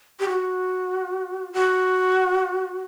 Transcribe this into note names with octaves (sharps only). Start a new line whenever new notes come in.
G4
F#4
F#4